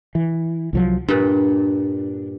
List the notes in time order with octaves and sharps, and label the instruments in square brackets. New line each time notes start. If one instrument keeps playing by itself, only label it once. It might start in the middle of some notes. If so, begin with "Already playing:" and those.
[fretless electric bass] E3
C2 F3 F#3
[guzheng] G2 A#2 [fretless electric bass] D4